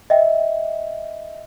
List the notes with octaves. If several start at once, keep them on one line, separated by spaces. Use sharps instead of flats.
D#5 E5 G5